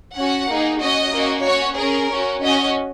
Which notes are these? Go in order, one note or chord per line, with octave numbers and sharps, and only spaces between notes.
C#4 F#4 F#5
A#3 D#4 G#4
C#4 F#4 D#5
A#3 C#4 F#4
C#4 F#4 C#5
C#4 G#4 A#4
C#4 F#4
C#4 F#4 D#5